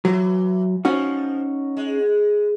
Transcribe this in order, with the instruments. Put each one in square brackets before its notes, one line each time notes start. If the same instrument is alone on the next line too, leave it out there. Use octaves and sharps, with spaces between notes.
[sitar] E3 [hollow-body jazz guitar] F#3
[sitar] F3 [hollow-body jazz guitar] C#4 D#4 F#4
[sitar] G#3